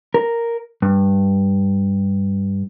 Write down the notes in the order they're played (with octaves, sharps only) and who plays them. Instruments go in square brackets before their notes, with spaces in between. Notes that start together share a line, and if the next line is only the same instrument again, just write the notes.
[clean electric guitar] A#4
G2